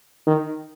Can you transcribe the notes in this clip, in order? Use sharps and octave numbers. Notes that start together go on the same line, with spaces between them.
D#3